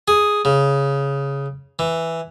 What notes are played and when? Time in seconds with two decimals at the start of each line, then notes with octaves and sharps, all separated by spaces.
0.08 G#4
0.45 C#3
1.79 E3